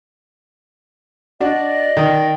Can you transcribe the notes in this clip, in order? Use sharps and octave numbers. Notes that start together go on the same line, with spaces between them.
D4 F#4 D5 D#5
D#3